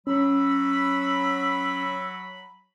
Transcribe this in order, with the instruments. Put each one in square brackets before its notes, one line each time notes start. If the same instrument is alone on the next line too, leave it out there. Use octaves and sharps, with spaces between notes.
[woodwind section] F#3 B5 [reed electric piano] C#4 [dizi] E6